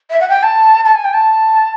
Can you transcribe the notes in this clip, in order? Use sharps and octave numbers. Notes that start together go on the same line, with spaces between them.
E5
F#5
G5
A5
A5
G#5
G5
A5